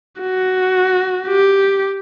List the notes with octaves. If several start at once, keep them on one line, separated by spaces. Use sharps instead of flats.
F#4
G4